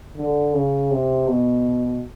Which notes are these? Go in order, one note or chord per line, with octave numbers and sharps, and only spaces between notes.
D3
C#3
C3
B2